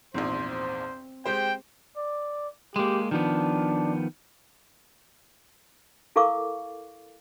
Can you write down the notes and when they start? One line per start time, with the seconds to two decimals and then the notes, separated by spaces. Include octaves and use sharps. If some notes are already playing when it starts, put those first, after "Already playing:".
0.14 A#1 E2 G#2 C4 C5
1.26 G#3 G4 C5 G5
1.97 D5
2.76 G#3 A#3 G4
3.11 D#3 F3 B3 D4
6.16 E4 A4 A#4 F5 C#6 D6